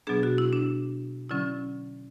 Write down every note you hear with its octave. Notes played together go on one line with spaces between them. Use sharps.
B2 F#3 B3 D4 G#4
F#4
E4
D4
D3 F#3 C#4 E4